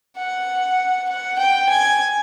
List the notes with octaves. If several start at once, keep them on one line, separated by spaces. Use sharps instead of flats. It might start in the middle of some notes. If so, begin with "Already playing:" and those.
F#5
F#5
G5
G#5